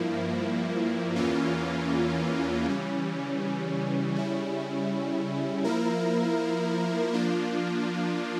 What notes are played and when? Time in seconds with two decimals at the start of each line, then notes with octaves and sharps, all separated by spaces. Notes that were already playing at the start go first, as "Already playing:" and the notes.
Already playing: G2 F3 A#3 E4
1.16 E2 E3 A#3 C#4 F4
2.66 C#3 E3 G3 C#4
4.15 C#3 G3 C#4 E4
5.64 F3 A#3 E4 A#4
7.14 F3 A#3 D4 F4